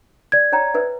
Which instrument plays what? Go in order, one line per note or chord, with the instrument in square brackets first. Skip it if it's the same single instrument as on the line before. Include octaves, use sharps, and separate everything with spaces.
[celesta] D5 G#6
[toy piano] C#5 G5 A#5
B4 C5 E5